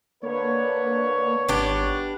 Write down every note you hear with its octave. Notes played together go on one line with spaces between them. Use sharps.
D3 A#3 B4 C#5
G#1 B3 D4 G4